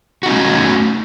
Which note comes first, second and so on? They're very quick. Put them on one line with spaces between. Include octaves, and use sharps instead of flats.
F#4 D#4 C#4 A3